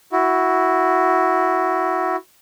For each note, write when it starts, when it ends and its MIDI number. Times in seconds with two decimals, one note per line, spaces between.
0.12 2.16 64
0.12 2.16 66